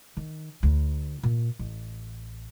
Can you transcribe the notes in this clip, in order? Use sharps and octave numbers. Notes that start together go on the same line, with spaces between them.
D#3
D2
A#2
A1